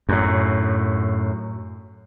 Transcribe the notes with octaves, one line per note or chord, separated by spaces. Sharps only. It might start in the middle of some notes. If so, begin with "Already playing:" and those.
F#2 A2